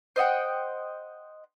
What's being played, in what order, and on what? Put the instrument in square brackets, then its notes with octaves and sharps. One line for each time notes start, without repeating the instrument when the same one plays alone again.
[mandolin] C5 D#5 F#5 G5